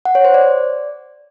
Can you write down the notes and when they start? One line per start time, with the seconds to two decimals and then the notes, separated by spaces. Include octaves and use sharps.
0.05 F#5
0.15 C#5
0.25 C5
0.34 D5